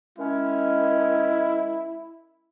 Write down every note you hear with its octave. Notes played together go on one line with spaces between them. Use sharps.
D#3 G#3 C#4 E4